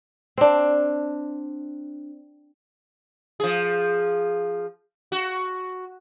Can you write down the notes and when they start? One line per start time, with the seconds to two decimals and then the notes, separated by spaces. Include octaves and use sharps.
0.38 C4 D4
3.40 F3 G#4
5.12 F#4